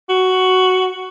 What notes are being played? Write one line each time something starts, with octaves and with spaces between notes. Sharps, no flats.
F#4